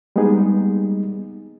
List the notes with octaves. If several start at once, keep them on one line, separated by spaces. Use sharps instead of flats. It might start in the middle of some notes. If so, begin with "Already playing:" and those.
G3 G#3 A#3 B3 D#4 G#4